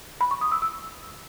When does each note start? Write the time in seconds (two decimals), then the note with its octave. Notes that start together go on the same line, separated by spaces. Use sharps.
0.21 B5
0.31 C#6
0.41 D#6
0.52 E6
0.62 E6